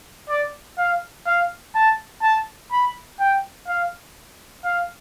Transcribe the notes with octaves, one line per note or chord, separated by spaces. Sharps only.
D5
F5
F5
A5
A5
B5
G5
F5
F5